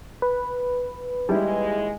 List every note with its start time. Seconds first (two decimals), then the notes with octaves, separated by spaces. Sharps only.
0.22 B4
1.29 D#2 E3 G3 G#3 E4